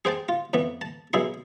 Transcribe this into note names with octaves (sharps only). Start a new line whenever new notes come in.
G#4 C5 G5 A5
F4
F2 E3 B3
A5
B1 B2 E4 G#4 C6